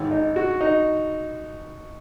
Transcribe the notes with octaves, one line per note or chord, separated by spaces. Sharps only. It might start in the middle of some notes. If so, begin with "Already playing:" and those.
Already playing: G#1 G#2
D#4
F#4
D#4